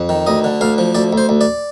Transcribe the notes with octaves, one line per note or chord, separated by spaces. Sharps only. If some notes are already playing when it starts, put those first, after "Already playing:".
Already playing: F2
D#3
D2 D#5
D3
D2 F5
F3
D2 D5
D2
C5
D2
D5